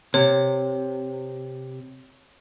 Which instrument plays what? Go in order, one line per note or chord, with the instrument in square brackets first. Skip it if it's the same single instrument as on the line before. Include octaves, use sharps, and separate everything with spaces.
[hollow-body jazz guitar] C3 [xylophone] C#5